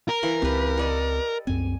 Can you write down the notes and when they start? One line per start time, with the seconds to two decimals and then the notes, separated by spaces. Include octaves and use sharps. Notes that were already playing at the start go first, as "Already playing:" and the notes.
0.09 A#4
0.23 E3 F5 B5
0.42 C#2 C4 G4 B4
0.78 A4 D5 D#5
1.47 C2 F#2 C4 G#5